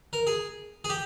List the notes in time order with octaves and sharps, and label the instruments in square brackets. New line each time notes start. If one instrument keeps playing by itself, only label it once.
[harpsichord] A#4
G#4
G#4
G4